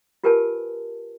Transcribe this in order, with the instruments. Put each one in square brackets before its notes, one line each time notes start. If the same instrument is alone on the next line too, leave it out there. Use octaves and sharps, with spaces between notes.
[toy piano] F4 G4 A#4 B4 G#5 A5